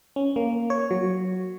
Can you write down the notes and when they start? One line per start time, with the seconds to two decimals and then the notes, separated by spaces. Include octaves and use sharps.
0.16 C#4
0.36 A#3
0.70 C#5
0.91 F#3